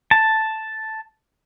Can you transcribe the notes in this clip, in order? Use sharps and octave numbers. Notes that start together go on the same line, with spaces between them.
A5